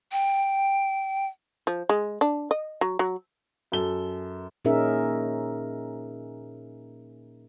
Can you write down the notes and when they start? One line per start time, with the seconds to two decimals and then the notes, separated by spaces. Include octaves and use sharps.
0.12 G5
1.67 F3
1.89 G#3
2.21 D4
2.51 D#5
2.81 F#3
2.99 F#3
3.72 F#2 A4 G7
4.65 A#2 C#4 D#4 G#4 A#4 E5